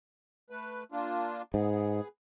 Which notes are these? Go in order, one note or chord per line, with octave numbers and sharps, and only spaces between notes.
A3 B4
A#3 D4 F4
G#2 B3 G#4